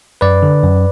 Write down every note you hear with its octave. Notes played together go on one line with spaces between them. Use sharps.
F#2 B4 D5
D3
F#2